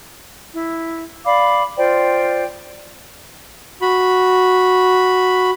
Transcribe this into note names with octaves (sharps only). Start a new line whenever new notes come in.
E4
D5 F5 B5 D6
F4 C5 D5 G5
F#4 B5